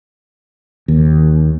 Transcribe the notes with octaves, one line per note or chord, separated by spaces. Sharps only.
D#2